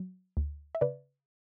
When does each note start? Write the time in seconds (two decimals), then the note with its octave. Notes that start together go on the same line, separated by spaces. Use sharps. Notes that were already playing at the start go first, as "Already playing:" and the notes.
Already playing: F#3
0.37 D2
0.75 E5
0.81 C#3 B4 D5